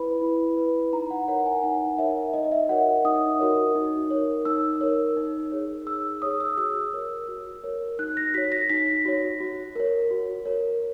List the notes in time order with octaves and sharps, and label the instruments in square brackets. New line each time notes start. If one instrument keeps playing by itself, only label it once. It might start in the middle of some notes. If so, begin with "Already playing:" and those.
Already playing: [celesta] E4 B4 B5
E4
B4
D#4 A#5
F#5
A#4 C#5 F#5
G#5
D#4 F#5
A#4 C#5 E5
D#4 D#5
E5
F#4 A#4 C#5 F#5
D#4 D#6
F#4 A#4 C#5
D#4
A#4 C#5
D#4 E6
A#4 C#5
D#4
G#4 C#5
D#4 E6
G#4 C#5 D#6
E6
F#4 E6
A#4 C#5
F#4
A#4 C#5
D#4 F#6
A#6
F#4 C#5 B6
A#6
D#4 B6
F#4 C#5
F#4
A#4 C#5
F#4
A#4 C#5